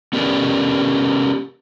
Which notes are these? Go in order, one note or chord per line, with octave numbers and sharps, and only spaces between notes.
B3 C#4 G4 A#4 D5